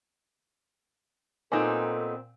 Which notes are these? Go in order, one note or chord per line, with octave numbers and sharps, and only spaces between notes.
A#2 B3 C4 D#4 A4 G#5 D6